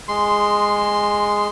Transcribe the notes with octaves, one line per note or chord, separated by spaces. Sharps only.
G#3 C6